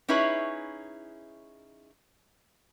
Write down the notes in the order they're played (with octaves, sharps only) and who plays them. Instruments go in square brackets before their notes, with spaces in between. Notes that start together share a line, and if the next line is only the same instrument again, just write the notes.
[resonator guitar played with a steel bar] C#4 D#4 E4 G#4 B4 C#5